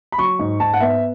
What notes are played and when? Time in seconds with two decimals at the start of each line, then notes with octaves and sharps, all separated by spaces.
0.12 B5
0.19 F#3 C#6
0.39 G#2
0.60 G#2 A5
0.74 F#5
0.80 B3 E5